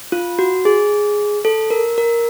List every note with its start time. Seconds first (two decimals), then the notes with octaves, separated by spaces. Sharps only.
0.12 F4
0.39 F#4
0.65 G#4
1.45 A4
1.70 A#4
1.98 A#4